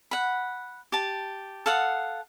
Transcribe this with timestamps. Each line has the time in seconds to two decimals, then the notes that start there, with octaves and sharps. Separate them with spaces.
0.11 F#5 B5
0.92 G4 A5
1.66 A4 F5 F#5 D#6